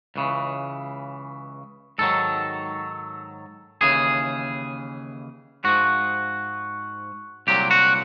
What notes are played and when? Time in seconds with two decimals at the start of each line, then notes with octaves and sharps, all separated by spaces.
0.16 C#2 C#3 E3
1.98 G#2 D#3 F#3 A4
3.81 D#2 C#3 E3 G#4
5.64 G#2 F3 F#4
7.47 C2 A#2 F#3 G4
7.71 F#4